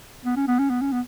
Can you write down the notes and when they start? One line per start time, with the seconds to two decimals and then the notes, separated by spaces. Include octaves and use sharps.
0.25 B3
0.36 C#4
0.48 B3
0.59 C#4
0.70 B3
0.81 C#4
0.92 B3